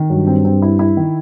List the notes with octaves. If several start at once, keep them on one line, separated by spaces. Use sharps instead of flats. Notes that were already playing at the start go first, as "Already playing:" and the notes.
Already playing: D#3
G2 F#3
C4
C4
E4
E4
D#3